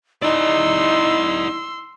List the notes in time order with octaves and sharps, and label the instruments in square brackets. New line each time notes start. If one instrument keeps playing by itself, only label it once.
[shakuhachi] D#4 [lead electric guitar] E4 D5 [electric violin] C6 E6